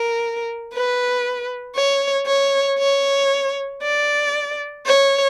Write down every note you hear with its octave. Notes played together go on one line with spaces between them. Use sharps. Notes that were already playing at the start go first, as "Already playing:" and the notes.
Already playing: A#4
B4
C#5
C#5
C#5
D5
C#5